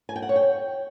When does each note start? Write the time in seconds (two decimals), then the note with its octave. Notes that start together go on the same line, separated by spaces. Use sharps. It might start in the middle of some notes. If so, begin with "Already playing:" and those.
0.09 G#5
0.16 G5
0.22 F#5
0.29 C#5
0.36 G5